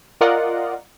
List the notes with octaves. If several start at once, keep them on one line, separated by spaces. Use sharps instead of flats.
F4 A#4 D5 D#5 F5 F#5